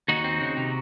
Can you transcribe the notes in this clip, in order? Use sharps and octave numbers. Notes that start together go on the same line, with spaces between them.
D#2 D#4 F#4
C4
C#3
C3